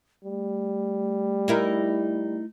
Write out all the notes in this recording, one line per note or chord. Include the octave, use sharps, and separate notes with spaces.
G3 A3
D#4 E4 A#4